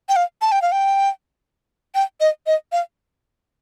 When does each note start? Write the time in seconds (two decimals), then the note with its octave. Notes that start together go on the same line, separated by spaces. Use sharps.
0.09 G5
0.16 F5
0.42 A5
0.52 G5
0.62 F5
0.72 G5
1.95 G5
2.20 D#5
2.47 D#5
2.72 F5